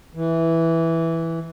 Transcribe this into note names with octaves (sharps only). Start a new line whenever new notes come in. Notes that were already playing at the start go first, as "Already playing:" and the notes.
E3